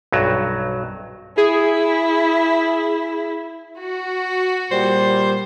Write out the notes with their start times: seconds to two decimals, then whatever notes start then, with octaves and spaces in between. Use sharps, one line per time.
0.12 B1 G2 F#3
1.38 E4 G#4
3.78 F#4
4.71 A#2 G3 C5